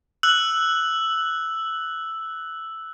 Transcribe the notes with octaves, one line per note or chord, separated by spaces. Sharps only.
E6 F#6 F#7